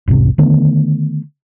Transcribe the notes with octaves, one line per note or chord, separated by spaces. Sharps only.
E1 C2 G#2 C3
D3 D#3 A3 B3